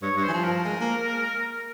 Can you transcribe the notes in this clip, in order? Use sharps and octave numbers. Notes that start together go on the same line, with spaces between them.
G2 C#5
G2 C#5
C5
E3
F3 C5
A#4
G#3
A#3